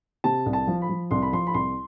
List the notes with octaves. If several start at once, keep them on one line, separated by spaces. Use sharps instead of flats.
C3 A5
C2
A5
F3
B5
F3
C2 C6
B5
F3 C6
B5
C2 C6